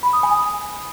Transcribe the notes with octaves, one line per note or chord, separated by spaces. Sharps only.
B5
D#6
G#5
G#5